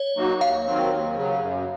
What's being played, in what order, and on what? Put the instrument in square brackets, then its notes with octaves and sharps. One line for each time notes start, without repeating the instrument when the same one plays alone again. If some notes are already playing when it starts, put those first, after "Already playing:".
Already playing: [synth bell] C#5
[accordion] F#3 A#3 D#4 F#4
[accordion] D#2 [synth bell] F5
[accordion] D#3 F#3 C4
D#2
C#3 F#3
F#2